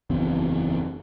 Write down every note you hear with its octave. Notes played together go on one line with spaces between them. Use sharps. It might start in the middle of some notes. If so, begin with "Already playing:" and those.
F#1 E2 C4